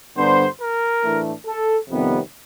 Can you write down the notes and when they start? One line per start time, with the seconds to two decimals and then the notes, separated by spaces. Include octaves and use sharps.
0.17 G2 D3 G3 B3 D4 C5
0.60 A#4
1.03 A2 E3 A3 D4
1.47 A4
1.90 F2 C3 D#3 G3 B3